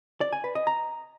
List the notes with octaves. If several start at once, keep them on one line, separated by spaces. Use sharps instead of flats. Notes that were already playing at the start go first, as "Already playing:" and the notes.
D5
G#5
B4
D#5
A#5